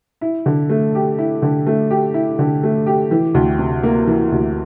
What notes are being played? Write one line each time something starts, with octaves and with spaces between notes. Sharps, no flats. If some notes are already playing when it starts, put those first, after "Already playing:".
E4
D3
A3
G4
E4
D3
A3
G4
E4
D3
A3
G4
E3
D2
C3
A#3
E3
D2